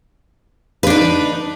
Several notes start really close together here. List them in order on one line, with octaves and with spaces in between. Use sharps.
B4 D4 D#4